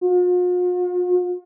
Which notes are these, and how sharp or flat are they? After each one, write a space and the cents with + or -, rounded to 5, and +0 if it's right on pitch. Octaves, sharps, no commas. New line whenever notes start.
F4 +45